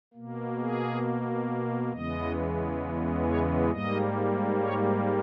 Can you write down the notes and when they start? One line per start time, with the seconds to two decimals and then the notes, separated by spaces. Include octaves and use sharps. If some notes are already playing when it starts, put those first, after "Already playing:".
0.14 B2 A#3
0.59 G#4
1.92 E2 C#3 E3 G#3 B3 D#5
3.25 C#5
3.70 G#2 G3 A#3 D#5
4.61 C#5